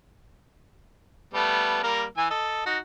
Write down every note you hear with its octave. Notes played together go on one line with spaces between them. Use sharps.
G3 A3 B3
G3 A#3 A#4
E3 G#5 E6
A4 D#5
D#4 F#4